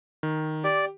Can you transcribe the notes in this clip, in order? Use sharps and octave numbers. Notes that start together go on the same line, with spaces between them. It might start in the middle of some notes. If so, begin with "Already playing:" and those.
D#3
G4 D5